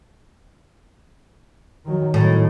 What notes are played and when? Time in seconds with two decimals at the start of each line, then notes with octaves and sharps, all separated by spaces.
1.86 D#3 F#3
2.14 A2 D#3